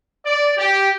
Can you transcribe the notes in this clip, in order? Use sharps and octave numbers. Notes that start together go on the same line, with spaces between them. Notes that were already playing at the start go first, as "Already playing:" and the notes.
D5
G4